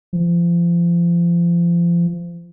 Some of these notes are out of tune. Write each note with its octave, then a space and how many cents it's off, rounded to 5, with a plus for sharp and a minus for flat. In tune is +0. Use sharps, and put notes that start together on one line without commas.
F3 -30